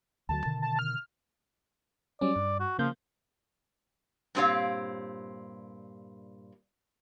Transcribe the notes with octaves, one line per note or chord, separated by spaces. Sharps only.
D2 D3 F#3 A5
B2 D3 D#3
A5
F6
F#3 G3 C#4 D5
G2
F#4
C#3 F3 A#3 G6
G2 A#2 C4 G4 C#5 F5